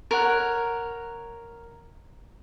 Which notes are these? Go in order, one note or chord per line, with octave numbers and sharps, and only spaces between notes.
A#4 C#5 F#5